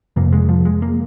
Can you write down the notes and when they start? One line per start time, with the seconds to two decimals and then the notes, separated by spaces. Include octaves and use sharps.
0.16 F2 C3 A#3
0.33 G#3
0.49 F3
0.65 G#3
0.82 A#3